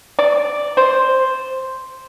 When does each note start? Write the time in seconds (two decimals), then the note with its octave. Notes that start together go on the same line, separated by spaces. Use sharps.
0.19 D5
0.77 C5